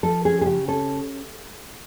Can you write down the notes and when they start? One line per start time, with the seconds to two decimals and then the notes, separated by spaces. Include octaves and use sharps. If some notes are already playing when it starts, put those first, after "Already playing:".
0.03 F3 A4
0.25 C#4 G#4
0.41 G#4
0.46 C#3 G4
0.68 C#4 A4